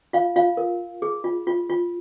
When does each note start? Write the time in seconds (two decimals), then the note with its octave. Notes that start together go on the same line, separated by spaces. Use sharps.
0.13 F4 F5
0.36 F4 F5
0.57 A#4
1.02 G#4
1.24 F4
1.47 F4
1.69 F4